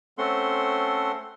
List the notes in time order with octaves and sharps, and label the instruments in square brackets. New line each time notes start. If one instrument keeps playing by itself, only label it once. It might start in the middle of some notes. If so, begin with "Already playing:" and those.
[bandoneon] A3 C4 C#4 A4 F#5 C6